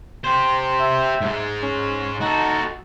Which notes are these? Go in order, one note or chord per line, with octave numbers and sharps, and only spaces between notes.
G4 C5
E5
G#2 G#3
C#4
D#4 F#4 A4